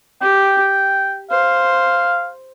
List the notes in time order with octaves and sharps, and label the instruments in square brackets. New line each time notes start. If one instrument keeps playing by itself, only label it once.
[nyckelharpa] G4 [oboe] G5
[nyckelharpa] C5 [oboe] F5